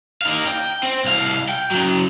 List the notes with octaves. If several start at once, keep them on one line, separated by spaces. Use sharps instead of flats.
D#4 F5
G5
C4
C2 F5
G5
C#3 F#3